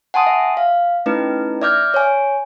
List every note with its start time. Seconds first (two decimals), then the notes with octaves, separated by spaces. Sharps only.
0.14 F#5 G#5 A5 C6 D#6
0.27 E5
0.57 F5
1.06 A3 C#4 D#4 E4 B4
1.62 D5 E5 D6 F6 G6 G#6
1.94 C#5 G#5